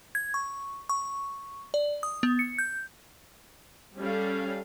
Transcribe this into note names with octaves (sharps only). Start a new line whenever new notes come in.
G#6
C#6
C#6
D5
D#6
B3
C#7
G6
G3 C#4 A4 F5